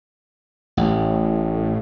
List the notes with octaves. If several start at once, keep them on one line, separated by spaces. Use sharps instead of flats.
A1 A2